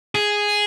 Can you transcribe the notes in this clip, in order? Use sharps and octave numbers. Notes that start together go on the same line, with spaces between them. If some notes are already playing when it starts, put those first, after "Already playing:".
G#4